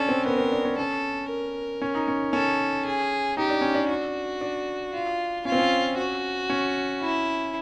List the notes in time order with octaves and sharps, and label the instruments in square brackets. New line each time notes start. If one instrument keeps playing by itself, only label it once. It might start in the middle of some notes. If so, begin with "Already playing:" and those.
Already playing: [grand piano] C#4 D4 [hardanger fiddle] A4
[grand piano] C4
[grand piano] B3 [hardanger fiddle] A#4
[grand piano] C4
D4
C#4
[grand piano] C#4 [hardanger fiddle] A4
[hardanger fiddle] A#4
[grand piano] C#4
D#4
C#4
[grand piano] C#4 [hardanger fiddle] A4
[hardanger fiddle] G#4
[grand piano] D#4 [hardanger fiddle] G4
[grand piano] D4
C#4
D4
[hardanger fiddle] F#4
[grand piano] D4
[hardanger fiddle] F4
[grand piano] C#4 [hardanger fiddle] F4
[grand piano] C4
C#4
[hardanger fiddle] F#4
[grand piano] C#4
[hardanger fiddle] E4